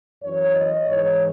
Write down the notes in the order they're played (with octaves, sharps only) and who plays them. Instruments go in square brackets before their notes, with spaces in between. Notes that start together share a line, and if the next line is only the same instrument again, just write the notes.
[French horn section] F#2 E3 C#5
D#5
G#2 E3 C#5